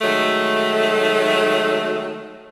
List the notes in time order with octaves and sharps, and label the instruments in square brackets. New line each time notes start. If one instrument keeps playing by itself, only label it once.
[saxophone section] D#3 F#3 G#3 A3